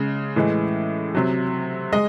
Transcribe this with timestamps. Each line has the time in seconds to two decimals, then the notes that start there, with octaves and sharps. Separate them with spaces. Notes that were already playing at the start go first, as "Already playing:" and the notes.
Already playing: C#3 G#3
0.36 A2 E3 G#3
1.15 C3 F#3
1.92 G#3 D#5